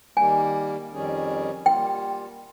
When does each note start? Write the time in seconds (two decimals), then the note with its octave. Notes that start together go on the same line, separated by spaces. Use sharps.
0.17 D#3 G3 A#3 G#5
0.91 F2 D#3 G3 C#4 G#4
1.66 G3 A#3 F4 G5